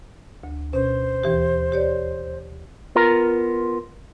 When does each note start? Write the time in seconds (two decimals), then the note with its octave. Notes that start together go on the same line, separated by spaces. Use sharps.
0.44 D2
0.73 B2 C#4 C5
1.23 D#2 E3 G4
1.72 G4 C#5 D5
2.95 B3 F4 A#4 A#5